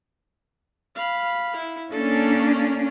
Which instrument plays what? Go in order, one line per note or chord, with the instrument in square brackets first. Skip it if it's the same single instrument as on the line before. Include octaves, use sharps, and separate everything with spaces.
[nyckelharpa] F5 B5
E4
[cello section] A#3 C#4 D4 [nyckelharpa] A4